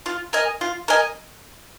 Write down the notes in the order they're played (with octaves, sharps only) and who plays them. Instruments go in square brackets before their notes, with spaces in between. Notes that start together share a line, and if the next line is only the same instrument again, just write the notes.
[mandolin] F4
A#4 D#5 G#5
F4
A#4 D#5 G#5